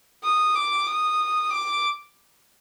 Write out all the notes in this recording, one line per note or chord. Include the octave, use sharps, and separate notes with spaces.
D#6
D6
D#6
D6